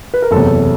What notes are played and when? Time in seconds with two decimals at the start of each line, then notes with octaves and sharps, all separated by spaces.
0.14 B4
0.22 A#4
0.31 F#1 E2 C3 A4